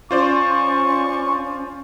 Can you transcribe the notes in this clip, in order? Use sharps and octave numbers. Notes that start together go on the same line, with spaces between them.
C#4 F4 C5 D5 C#6